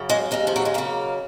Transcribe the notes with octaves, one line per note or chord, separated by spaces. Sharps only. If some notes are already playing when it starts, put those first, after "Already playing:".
Already playing: F#2 C#3
G#3
D#2 C#3 G#3
F3
F#3
G#3
F#2 C#3 A#3